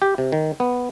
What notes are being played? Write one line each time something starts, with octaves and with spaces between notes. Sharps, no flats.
G4
C3
D#3
B3